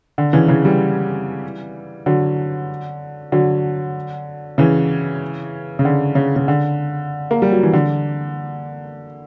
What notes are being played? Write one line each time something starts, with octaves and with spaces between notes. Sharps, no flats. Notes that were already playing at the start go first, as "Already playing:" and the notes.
D3
C#3 E3
C#3 E3
E3 G3
D3 F#3
D3 F#3
C#3 E3
C#3
D3
C#3
C#3
D3
A#3
G3
F#3
E3
D3